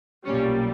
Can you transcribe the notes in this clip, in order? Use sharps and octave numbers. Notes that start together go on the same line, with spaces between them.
B1 A#2 G3 C#4